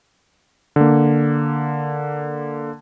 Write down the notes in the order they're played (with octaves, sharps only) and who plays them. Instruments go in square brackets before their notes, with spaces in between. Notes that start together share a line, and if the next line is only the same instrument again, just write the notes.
[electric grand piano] D3 A#3